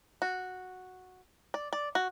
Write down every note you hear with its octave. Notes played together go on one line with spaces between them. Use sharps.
F#4
D5
D5
F#4